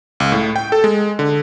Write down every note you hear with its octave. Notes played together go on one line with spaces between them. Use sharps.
C#2
A2
G5
A4
G#3
D3